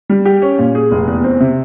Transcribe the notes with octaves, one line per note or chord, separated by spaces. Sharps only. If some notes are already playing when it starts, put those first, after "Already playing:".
G3
G4
C#4
A#2
G#4
F1
E2
C4
C3